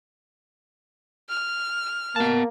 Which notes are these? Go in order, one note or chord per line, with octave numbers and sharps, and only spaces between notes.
F6
A#3 B3 A5